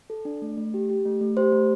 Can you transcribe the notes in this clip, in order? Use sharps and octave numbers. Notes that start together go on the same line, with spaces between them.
A4
D4
A3
A3
G4
G4
A3
A3
G4 C5
A3